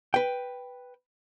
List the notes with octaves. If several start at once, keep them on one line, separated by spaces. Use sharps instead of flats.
B4 G5